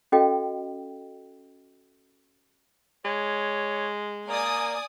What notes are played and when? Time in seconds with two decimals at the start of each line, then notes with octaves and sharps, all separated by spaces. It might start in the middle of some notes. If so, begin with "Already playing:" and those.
0.12 C#4 F#4 A4 D#5 F5 G5
3.05 G#3 C#5
4.28 A#3 D5 G#5 D#6